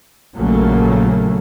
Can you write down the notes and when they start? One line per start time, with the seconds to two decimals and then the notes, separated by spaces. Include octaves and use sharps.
0.36 A#1 C#3 F#3 A3 A#3